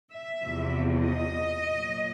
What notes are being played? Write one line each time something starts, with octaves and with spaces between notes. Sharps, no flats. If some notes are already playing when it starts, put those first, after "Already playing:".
E5
E2 C3 F3
D#5
A#2 F#3